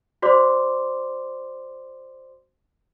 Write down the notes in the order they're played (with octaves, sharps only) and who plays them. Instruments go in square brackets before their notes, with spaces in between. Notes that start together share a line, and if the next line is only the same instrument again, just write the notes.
[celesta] F#4 C5 D5 C6 D6